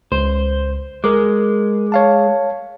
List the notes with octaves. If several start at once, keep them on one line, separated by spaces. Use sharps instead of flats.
C#2 C5
G#3 A#4 D6
C#5 F5 A5